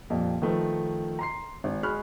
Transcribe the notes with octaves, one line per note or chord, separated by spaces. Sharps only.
F2 A#2 G3
D#3 F3 A3 B4
A#5 C6 C7
G#1
G#3 F#4 B5 C#6 F6 F#6